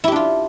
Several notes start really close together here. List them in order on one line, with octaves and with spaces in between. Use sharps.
E4 G4 D4 F4